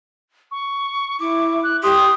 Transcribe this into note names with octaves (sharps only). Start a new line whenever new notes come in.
C#6
E4 D6
F#6
G4 C6 D#6